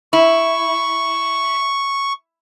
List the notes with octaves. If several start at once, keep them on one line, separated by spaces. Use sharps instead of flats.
E4 C#6